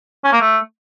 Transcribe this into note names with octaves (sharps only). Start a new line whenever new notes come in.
C#4
A#3
A3